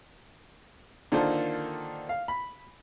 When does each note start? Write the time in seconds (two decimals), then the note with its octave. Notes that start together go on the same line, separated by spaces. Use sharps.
1.12 D3 D#3 A#3 F4 A4 C5
2.09 F5
2.28 B5